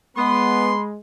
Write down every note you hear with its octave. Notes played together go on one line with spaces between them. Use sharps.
G#3 B3 B5 C6